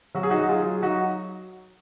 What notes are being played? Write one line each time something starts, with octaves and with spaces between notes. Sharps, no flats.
F#3 F#4
G#4
D#4 F#4
F#3
F4 G#4
F#3
F#3 D#4 F#4